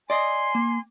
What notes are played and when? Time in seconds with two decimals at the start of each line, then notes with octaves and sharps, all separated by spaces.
0.10 D5 D#5 G#5 C6
0.55 A#3